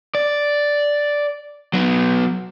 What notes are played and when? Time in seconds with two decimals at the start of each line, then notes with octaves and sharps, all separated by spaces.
0.15 D5
1.73 F#3 B3